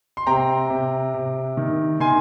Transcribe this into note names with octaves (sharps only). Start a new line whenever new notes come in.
C6
C3 G5 A#5
C3
C3
D#3
D#3 G#5 C6